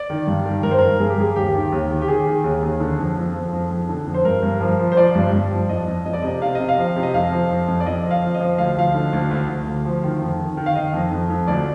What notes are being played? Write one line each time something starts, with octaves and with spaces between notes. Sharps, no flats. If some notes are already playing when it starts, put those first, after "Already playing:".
Already playing: D5
D#3
G2
D#3
G2 A#4
C5
G2 A#4
G2 G#4
G4
G2 G#4
D#2 G4
D#3
D#2
D#3
G4
D#3 G#4
D#3
D#2
D#2
D3
F2
F2
F3
F2
F2
D3
F2
C5
G2 A#4
G2
F3
F3
C5
F3 D5
G2
G2
F3
F2 D#5
F2
F2 D#5
D5
C3 D#5
C3 F5
C3 D#5
F5
F3
C3
D#5
F2 F5
F3
F2
F2
D5
F2 D#5
F3
F5
F3
D#5
F3
D2 F5
F3 F5
D3
D2
D2
D2
D2
F3
D#3
F2
D#3
D#3
F5
D#3 D#5
F2
F2
F2
D2 D5